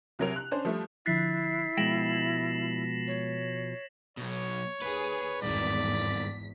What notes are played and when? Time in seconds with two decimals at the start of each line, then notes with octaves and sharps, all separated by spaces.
0.19 C2 C3 F#3 A#4 F7
0.36 F#6
0.51 C#4 D4 C5
0.65 F3 G3 A3
1.06 D3 F3 E4 F#6 A6 B6 C7
1.77 B2 F3 G#3 G5 A#6 E7 F#7
3.07 C#5
4.17 B1 B2 C#5
4.82 D#2 G#4 B4
5.42 G#1 E2 G2 D#3 D5 B6